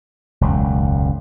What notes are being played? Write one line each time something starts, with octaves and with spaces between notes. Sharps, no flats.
E1 C#2 F#2